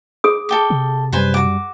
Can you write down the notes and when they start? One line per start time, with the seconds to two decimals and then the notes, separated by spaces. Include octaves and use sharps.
0.24 G#4 D#6
0.49 A4 G5 D6
0.70 C3
1.12 F#2 G3 B4 C5 G#5
1.34 F#4 D6